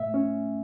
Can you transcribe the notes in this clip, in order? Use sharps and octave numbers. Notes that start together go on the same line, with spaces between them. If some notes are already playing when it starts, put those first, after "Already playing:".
Already playing: A2 A3 E5
C#4